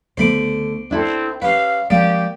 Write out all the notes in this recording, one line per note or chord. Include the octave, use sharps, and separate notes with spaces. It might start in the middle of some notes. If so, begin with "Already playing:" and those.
C#2 D3 A3 B3 C5 B5 D6
C4 D4 E4 A4
C#4 G4 B4 F5
F3 G#3 A#3 C4 F4 G4 D5